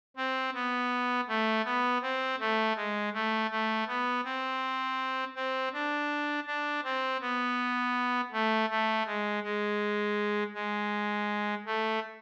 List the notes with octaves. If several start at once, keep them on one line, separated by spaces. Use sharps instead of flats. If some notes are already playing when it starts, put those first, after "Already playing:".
C4
B3
A3
B3
C4
A3
G#3
A3
A3
B3
C4
C4
D4
D4
C4
B3
A3
A3
G#3
G#3
G#3
A3